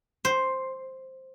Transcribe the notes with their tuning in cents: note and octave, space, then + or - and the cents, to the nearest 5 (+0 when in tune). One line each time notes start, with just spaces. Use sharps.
C5 +5